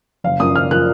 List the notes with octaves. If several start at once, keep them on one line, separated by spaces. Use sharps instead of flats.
F#1 F5
F#2 F3 A#3 D#6
F#1 F6
F3 A#3 F#6